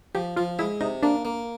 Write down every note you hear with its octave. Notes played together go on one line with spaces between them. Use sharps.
F3 G4
F3 F4
G#3 E4
C3 D#4
A#3 D4
A#3